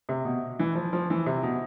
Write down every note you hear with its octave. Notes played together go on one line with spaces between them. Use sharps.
C3
B2
E3
F3
F3
E3
C3
B2